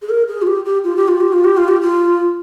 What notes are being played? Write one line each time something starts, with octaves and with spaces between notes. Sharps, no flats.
G#4
A#4
G#4
F4
G4
G4
F4
G4
F4
G4
F4
G4
F4
G4
F4